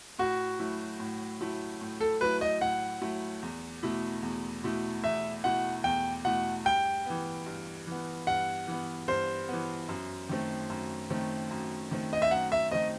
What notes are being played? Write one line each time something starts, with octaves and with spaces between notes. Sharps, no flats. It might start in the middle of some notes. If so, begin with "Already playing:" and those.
A2 F#4
F#3 A3 E4
A2
F#3 A3 E4
A2
A4
F#3 A3 E4 B4
D#5
A2 F#5
F#3 A3 E4
E2
B2 A3 E4
E2
B2 A3 E4
E2 E5
B2 A3 E4 F#5
E2 G5
B2 A3 E4 F#5
G2 G5
E3 B3
G2
E3 B3
G2 F#5
E3 B3
G2 C5
E3 B3
F#2
D#3 A3 C4
F#2
D#3 A3 C4
F#2
D#3 A3 C4
D#5
E5
F#2 F#5
E5
D#3 A3 C4 D#5